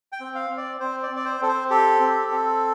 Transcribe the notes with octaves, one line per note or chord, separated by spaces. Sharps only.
G5
C4
F5
C4
D5
C4 C5
D5
C4
D5
C5
C4 A4
C5
G4 A4
C4
C4